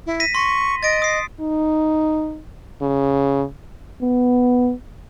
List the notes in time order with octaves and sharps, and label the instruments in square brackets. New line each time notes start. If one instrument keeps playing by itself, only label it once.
[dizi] E4
[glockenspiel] A#6 B6 D#7
[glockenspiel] C6 A#6 [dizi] C#6
[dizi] D#5 [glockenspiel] A6 D7
[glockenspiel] D#6 C7
[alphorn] D#4
C#3
[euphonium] B3